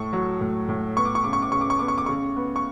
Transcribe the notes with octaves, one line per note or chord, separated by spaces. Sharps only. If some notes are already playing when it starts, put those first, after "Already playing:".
Already playing: A2 C#6
F#3
A2
A2
B3 C#6
D6
C#6
C#3 D6
C#6
D6
C#3 C#6
D6
C#6
B3 D6
C#6
D6
C#3 C#6
B3
C#6